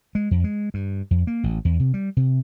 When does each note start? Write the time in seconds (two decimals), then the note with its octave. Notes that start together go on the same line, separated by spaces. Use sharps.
0.15 G#3
0.31 F2
0.44 G#3
0.74 G2
1.11 F2
1.27 A#3
1.44 A1
1.65 E2
1.79 C3
1.94 G3
2.17 C3